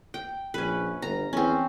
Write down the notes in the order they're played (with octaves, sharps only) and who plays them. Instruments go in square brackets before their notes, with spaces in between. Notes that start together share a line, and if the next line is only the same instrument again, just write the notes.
[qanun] G5
[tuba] A#1 [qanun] C#4 B4
[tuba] G1 [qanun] A#5
[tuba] E2 [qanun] C4 C#4